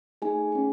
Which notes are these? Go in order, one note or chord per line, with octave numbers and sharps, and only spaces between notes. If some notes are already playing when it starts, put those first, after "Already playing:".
A3 D#4 G#4 G#5
C#4 G#4